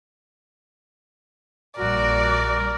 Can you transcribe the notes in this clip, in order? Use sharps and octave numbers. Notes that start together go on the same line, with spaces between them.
A#1 G3 F#4 A#4 D5